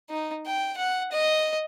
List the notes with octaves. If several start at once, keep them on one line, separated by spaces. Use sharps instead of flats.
D#4
G5
F#5
D#5